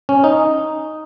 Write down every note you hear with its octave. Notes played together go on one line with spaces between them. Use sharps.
C#4
D#4